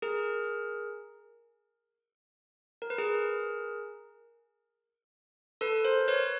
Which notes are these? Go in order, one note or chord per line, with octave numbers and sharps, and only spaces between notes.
G#4 A#4
A#4
B4
G#4 A#4
A4 B4
A#4 C5
B4 C#5